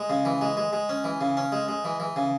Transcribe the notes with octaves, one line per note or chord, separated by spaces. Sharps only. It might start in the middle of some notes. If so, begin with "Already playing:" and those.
Already playing: G#3
C#3
E3
G#3
G#3
G#3
C#4
E3
C#3
C#4
G#3
G#3
E3
E3
C#3